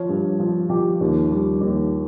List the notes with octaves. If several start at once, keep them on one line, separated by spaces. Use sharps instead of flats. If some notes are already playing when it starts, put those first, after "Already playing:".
Already playing: F3 C#5
G2
F3
F3 G4
D#2
G3
D#2